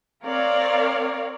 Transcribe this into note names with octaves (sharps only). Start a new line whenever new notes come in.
C4 A#4 C#5 D5 F5